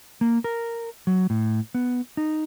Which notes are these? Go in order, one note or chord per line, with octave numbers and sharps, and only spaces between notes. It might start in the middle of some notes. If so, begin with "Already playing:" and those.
A#3
A#4
F#3
A2
B3
D#4